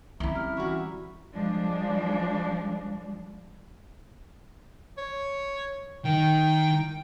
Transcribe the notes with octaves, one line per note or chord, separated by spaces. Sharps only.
C4 C#4 E4 E5 A#5
G3 F6
E3 G3 F#4 C#6
F3 G3 G#3 D4
C#5
D#3 G5